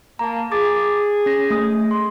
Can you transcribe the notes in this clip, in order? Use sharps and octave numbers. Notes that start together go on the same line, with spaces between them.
A#3 A5 A#5
G#4 D6 A6
C#4 A#6
A3 D#6
C6